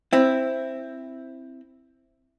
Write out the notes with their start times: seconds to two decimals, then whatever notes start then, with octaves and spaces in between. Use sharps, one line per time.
0.13 C4 E4